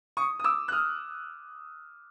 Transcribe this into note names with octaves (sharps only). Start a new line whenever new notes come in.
C#6 D#6
D#6
D6 E6
F#6
D#6 F6